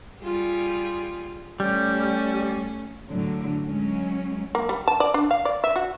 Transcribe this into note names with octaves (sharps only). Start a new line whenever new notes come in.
G3 F4 G#4
G3 A3 C#4
A2 D3 F#3
F#3 G#3 C#4
A#3
G3
A5
D5
D4
F5
D5
E5
F#4